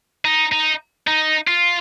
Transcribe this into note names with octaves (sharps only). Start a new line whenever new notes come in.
D#4
D#4
D#4
F4